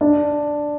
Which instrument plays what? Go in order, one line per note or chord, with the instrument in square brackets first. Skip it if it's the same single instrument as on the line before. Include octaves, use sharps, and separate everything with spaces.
[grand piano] D4